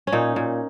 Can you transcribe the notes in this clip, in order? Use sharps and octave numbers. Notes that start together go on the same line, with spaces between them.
C#4
A#2 D#4
A#2